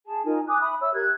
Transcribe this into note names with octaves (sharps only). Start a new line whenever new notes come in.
G#4 A5
D#4 F4 A#4 G#5
G#5 D6 D#6 F#6
E5 B5 D#6
C#5 E5 E6
G4 A#4 F#6 G#6